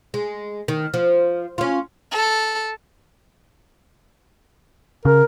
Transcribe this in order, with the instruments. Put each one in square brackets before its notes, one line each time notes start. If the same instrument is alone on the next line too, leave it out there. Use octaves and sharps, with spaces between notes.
[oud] G#3
D#3
F3
C#4 F4
[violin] A4
[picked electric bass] C#3 [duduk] A#4